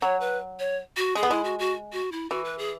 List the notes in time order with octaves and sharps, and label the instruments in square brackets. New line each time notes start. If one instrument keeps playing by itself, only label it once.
[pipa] F#3 [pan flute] C#5
[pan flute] B4
C#5
F#4
[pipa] G#3 [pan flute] G#4
[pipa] B3
[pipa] G#3 [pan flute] E4
[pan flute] F#4
F#4
F#4
E4
[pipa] E3 [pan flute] F#4
[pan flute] B4
G#4